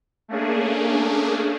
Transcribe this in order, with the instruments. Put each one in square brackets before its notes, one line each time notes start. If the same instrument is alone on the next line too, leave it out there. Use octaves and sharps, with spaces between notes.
[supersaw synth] A3 A#3 C#4 D4 G#4